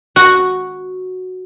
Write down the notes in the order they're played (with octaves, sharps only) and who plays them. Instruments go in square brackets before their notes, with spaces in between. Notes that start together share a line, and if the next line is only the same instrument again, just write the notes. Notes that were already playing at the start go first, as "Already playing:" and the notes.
[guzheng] F#4